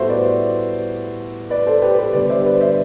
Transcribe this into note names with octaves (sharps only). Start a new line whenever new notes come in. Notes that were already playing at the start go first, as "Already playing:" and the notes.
Already playing: A2 G3 B3 F#4 A4 C5 E5
B4 D5
B4 D5
A4 C5
G4 B4
G4 B4
G2 D3 G3 B3 B4 D5
C5 E5
B4 D5
C5 E5